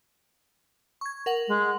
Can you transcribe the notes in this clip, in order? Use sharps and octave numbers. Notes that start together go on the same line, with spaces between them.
C#6 G#6
A#4 F#5 F#7
G#3